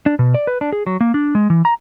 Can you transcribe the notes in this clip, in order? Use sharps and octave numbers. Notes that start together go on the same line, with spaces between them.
D4
B2
D5
B4
D4
G#4
F#3
A#3
D4
G#3
E3
A#5